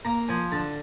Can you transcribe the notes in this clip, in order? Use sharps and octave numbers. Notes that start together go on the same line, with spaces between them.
A#3 A#5
F3 G#5
D3 A5